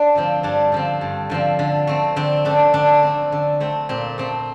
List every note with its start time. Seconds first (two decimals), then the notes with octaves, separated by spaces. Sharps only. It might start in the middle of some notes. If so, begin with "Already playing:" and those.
Already playing: D4
0.15 D3 F3 C4
0.43 G2 D4
0.72 D3 F3 C4
1.01 G2
1.30 D3 F3 C4
1.59 D3
1.87 A3 C4
2.16 D3 C4
2.45 A3 C4 D4
2.74 D3 D4
3.03 A3 C4
3.32 D3
3.60 A3 C4
3.89 A#2 C4
4.18 A3 C4